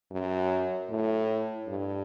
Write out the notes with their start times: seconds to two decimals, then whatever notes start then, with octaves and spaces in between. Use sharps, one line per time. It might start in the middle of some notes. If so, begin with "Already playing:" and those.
0.11 F#2
0.90 A2
1.68 G2